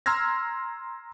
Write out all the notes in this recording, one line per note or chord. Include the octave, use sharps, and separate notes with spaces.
A#5 C6 E6 F6 G#6 A#6